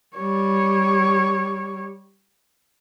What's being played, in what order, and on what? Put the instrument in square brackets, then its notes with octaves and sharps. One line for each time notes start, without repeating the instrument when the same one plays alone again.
[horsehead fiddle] G3 C#5